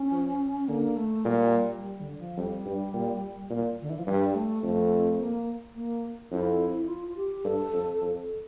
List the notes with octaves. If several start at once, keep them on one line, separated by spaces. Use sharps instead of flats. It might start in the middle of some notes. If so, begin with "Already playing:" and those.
Already playing: C#4
F3
D3 A#3
A3
A#2 G3
G3
D3
F3
F2 G3
G2
A#2
A#2
D3
E3
F3
G2 G3
A3
F2 A3
A#3
A#3
F2 E4
F4
G4
G2 A4
F2
F2
A4